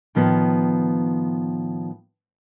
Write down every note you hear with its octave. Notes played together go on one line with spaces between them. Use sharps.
A2 D#3 F3 B3